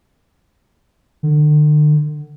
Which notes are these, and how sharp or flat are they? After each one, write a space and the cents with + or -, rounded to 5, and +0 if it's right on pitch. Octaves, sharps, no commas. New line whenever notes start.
D3 +35